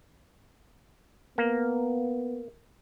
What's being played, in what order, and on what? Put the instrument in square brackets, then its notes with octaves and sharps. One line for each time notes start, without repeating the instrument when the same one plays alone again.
[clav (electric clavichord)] A#3 [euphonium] B3